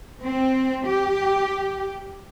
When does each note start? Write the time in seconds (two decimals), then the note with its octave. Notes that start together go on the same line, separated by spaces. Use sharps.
0.24 C4
0.87 G4